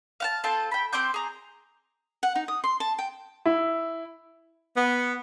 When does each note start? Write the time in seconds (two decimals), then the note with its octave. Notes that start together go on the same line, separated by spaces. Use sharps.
0.20 F5 F#5 A5
0.44 C4 F4 A4 A5
0.71 G5 B5
0.93 C4 C6 D6 G6
1.14 G#4 A#5
2.23 F#5
2.36 D#4
2.48 D#6
2.64 C6
2.80 A5
2.99 G5
3.45 E4
4.76 B3